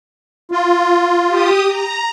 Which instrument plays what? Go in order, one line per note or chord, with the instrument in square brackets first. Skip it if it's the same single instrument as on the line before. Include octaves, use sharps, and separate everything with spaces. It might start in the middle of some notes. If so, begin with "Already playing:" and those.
[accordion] F4
[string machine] G4 D#6
A#5